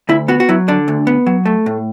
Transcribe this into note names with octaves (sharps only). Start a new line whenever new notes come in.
D2 E4
B3 F#4
F#4
F#3 E4
D3 D4
D2
B3
F#3
A3
A2